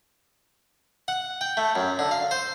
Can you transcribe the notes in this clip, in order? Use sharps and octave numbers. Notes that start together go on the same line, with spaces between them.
F#5
G5
A3
F#2
D3
F5
C5